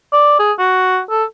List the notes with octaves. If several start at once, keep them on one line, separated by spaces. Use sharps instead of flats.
D5
G#4
F#4
A4